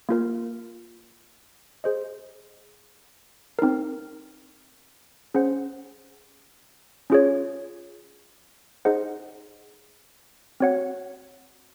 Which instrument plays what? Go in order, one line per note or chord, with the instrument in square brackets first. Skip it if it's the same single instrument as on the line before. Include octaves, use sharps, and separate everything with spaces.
[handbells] A#3 F4 A#4
G#4 C5 D#5
C4 D#4 A#4
C#4 G#4 C5 F#5
C#4 F4 G#4 C#5
D#4 G#4 C5 D#5 F#5
C4 F#4 C#5 F#5